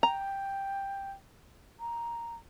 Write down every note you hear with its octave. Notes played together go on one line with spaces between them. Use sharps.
G5 A#5
A#5